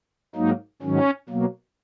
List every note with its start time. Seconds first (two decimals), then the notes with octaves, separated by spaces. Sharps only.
0.35 G#2 F#3 A#3 D#4
0.82 G#2 D#3 F#3 C#4
1.29 B2 F#3 A#3